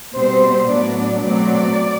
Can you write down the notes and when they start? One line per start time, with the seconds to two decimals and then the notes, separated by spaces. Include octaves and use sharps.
0.15 B2 G3 C4 C5
0.68 A2 F#3 B3 D4 D5
1.22 B2 F#3 A3 C4 D5